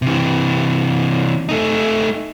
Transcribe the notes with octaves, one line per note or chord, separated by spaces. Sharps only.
C3 E3
A3 D#4